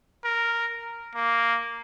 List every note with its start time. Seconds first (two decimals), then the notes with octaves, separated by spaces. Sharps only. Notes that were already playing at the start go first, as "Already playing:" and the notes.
0.25 A#4
1.16 A#3